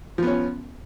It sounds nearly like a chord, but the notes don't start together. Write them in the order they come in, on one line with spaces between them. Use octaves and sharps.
F3 B3 C#4